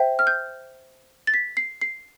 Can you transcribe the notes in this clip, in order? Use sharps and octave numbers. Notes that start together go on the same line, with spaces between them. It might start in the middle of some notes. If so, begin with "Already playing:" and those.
Already playing: C5 E5 G5
F6
G6
A6
B6
C7
C7